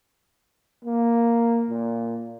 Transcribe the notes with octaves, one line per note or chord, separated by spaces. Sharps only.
A#3
A#2